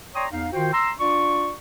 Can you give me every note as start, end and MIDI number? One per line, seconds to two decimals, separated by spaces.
0.15 0.26 73
0.15 0.26 74
0.15 0.26 79
0.15 0.26 82
0.15 0.26 84
0.15 0.26 87
0.32 0.48 40
0.32 0.48 63
0.32 0.48 77
0.53 0.71 51
0.53 0.71 65
0.53 0.71 66
0.53 0.71 72
0.53 0.71 79
0.72 0.91 82
0.72 0.91 84
0.72 0.91 88
0.99 1.53 62
0.99 1.53 65
0.99 1.53 74
0.99 1.53 85